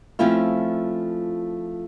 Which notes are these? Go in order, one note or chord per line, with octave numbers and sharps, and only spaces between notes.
F3 A3 C4 C#4 E4 F4